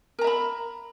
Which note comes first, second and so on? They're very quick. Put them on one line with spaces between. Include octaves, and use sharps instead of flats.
A#4 A#5 E5 B5